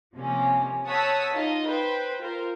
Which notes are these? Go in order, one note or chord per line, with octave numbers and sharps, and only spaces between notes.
C3 F3 A#3 C#4
C#5 F#5 A5 D#6 E6 B6
D#4 F4 D#5 F5
B4 C5 G5
F4 A#4 C5